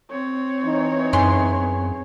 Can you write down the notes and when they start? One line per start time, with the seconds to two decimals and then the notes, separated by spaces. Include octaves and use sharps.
0.11 C4 C#5
0.64 E3 D#4
1.13 F#2 B3 G#4 C6